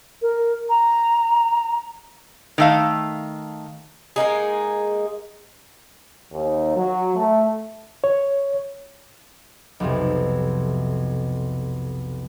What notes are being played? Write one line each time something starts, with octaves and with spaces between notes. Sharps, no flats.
A#4
A#5
D#3 A3 F5
G#3 A#3 D#4 G#4
D#2
F#3
A3
C#5
B1 F2 C3